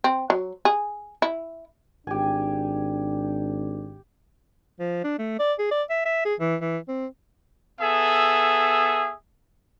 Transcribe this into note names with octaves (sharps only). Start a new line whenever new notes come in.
C4
F#3
G#4
E4
G#1 D4 G4 G#5
F3
D4
A3
D5
G#4
D5
E5
E5
G#4
E3
E3
C4
B3 G#4 A4 E5